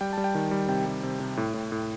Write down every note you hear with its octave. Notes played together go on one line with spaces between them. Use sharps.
G3 G5
G3 A5
G5
D#3
G3
C3 G5
G3
C3
C3
A2
A2
A2